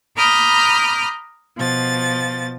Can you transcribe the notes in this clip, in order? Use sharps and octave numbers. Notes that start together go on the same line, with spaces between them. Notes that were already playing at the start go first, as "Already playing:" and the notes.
A#5 B5 D6 D#6 F6 G6
B2 F3 A6